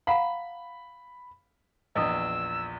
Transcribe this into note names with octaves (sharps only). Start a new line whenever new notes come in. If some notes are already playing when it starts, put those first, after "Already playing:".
F5 F#5 A#5 B5
A#1 E2 D#5 D#6 E6